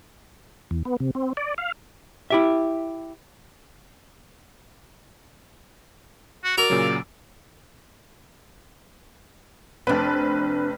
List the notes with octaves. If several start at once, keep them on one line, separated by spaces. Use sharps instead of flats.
E2
B3
C3
C4
D5
F5
E4 G4 E5
F#4
F#4 A#4 D5 A#5 E6
A#2 C#3 F#3
F1 C4 D4 B4